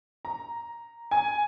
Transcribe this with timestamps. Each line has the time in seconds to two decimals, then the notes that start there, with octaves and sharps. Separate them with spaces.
0.25 A#5
1.11 G#5